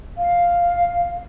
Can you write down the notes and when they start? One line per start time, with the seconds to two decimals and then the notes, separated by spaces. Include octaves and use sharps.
0.18 F5